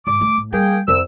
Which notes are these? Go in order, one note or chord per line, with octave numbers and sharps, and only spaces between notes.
G#2 D6
A3
A2
G3 A#3 G#4 G5
C2 F2 E6